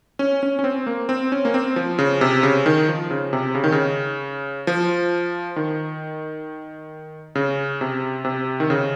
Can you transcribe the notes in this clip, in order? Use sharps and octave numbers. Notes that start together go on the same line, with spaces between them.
C#4
C#4
C#4
C4
A#3
C4
C#4
A#3
C4
F3
C#3
C3
C#3
D#3
F3
C#3
C3
C#3
D#3
C#3
F3
D#3
C#3
C3
C3
D#3
C#3